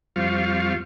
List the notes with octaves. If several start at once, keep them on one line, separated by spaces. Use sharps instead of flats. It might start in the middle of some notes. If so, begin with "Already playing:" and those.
F2 G3 C4 F4 F5 C#6